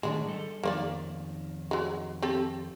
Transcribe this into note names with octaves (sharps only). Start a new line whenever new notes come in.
A2 D#3 G#3 D4 D5
G3 A4
F2 D#3 A#3 C5 D5
F#3 G#3
C4 G4 A4